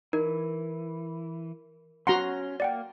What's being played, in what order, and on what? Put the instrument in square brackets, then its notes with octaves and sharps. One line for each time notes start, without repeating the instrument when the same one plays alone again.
[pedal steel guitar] E3 [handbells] D#4 [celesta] A#4
[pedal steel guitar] C#4 [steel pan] F#4 A#5 C6 [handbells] F#5
[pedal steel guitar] A#3 [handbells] D5 F#5 G5